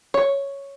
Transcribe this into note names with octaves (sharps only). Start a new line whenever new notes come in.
C#5